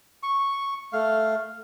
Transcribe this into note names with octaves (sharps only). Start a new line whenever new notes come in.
C#6
A3 F5